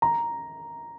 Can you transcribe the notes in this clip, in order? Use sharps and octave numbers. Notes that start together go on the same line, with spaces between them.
A#5